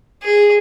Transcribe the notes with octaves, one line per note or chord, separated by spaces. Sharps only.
G#4